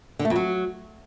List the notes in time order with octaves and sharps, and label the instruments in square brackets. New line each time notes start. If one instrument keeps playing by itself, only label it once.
[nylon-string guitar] D3
A3
F2
F#3